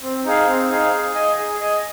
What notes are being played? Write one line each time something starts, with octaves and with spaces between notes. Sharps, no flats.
C4
D#4 G#4 F5
C4
D#4 G#4 F5
G#4
D#5 G#5
G#4
D#5 G#5